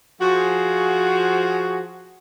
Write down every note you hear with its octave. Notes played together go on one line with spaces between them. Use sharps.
F3 F#4 G#4